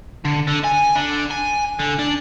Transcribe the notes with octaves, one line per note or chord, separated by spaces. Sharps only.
D3
D3
G#5
D3
G#5
D3
D4